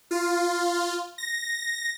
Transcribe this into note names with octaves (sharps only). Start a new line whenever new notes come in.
F4
A#6